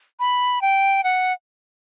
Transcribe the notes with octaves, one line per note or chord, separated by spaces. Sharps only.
B5
G5
F#5